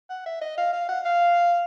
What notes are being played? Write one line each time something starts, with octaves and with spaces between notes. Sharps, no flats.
F#5
E5
D#5
F5
F5
F#5
F5